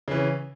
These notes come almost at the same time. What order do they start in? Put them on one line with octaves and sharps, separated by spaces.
C#3 E3 C#4